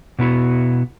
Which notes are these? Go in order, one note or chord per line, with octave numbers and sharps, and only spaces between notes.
B2 B3 E4 F#4